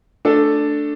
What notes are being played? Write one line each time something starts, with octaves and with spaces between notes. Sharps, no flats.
A3 D4 A4